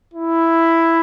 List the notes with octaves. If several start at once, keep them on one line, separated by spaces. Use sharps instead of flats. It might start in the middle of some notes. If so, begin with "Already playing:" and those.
E4